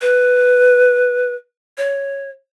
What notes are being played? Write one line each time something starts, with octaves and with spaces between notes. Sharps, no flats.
B4
C#5